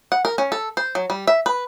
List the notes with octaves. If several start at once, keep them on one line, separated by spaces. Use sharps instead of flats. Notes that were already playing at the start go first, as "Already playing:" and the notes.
F#5
A#4
C#4
A4
C5
F#3
G3
E5
B4